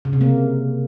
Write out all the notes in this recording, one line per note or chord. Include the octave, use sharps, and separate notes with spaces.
C#3
C3
A#3